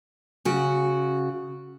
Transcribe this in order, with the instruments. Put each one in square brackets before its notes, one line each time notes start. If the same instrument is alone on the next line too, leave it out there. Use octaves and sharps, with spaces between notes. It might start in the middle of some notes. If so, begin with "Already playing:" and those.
[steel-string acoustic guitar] C#3 F#4